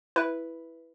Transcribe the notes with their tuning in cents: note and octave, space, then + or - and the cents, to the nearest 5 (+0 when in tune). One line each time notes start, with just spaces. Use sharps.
E4 +0 B4 +0